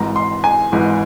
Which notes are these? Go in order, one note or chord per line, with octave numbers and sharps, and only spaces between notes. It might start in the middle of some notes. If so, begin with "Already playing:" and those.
Already playing: G#1 G#2 E3 A#5
C6
G#5
G#1 G#2 E3